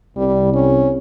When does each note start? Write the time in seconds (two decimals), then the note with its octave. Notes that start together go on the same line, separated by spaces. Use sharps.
0.17 C2 G3
0.54 C#4